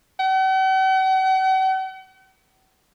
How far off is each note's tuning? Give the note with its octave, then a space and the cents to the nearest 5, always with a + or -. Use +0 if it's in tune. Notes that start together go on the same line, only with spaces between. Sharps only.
F#5 +45